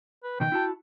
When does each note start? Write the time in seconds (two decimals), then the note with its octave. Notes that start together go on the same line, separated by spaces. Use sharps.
0.24 B4
0.40 B2 D#3 G5
0.52 E4 F#4 A5